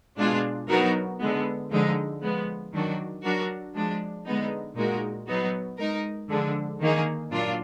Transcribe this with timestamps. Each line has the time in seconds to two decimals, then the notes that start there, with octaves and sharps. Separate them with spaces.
0.18 B2 G#3 D4 F4 G#4
0.69 F#3 B3 D#4 F#4 A#4
1.20 D3 G#3 B3
1.71 D3 F3 G#3 D#4
2.22 F3 G#3 B3
2.73 D#3 F#3 D4 F#4
3.23 F#3 D4 F#4 A#4
3.75 F3 G#3 D4
4.25 D3 G#3 B3 D#4
4.77 A#2 G#3 D#4 F#4 A#4
5.27 F#3 B3 D#4 F#4
5.78 G#3 D#4 A#4
6.30 D3 F3 G#3 D4
6.80 D#3 A#3 D#4 G#4
7.31 A#2 F#3 D4 F4